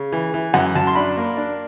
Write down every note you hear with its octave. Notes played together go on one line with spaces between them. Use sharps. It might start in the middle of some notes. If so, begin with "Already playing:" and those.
Already playing: C#3
E3
E3
F#2 F#5
F#2 A5
C6
D4 B5
A#3
D4